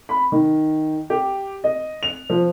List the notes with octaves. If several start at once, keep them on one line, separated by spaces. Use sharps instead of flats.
B5
D#3
G4
D#5
F7
F3